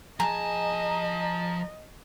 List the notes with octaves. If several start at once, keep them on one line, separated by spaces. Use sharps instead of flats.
F3 G#4 D#5 A5 A#5